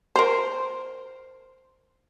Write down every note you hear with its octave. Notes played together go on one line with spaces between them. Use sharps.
A#4 C5